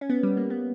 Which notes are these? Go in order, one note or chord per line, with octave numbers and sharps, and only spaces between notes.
C#4
B3
G3
A#3
B3